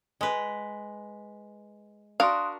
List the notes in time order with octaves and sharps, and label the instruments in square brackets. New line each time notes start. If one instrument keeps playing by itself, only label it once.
[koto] G#3 B4
[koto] D4 F#4 A#4 [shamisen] F5 [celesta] C6 D#6 F#6